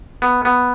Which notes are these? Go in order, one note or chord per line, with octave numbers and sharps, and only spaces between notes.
B3
B3